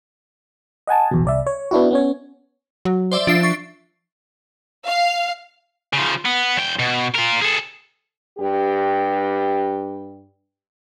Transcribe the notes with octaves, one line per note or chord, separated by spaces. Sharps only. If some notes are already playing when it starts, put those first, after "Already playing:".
D#5 F#5 G#5 A5
A#1 E2 B2
C2 D5 E5
C#5
B3 D4 E4 F#4
B3 C#4 C#5
F#3
C5 D5 E5
F3 D4 E5 C7
C#6
F5
C#3 F3
B3
E2 G5
B2
F4 A#4
G#4 A4
G2 G4